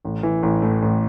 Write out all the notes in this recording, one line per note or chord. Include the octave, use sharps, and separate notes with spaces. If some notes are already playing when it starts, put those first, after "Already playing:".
A1
E3
A1
A2
A1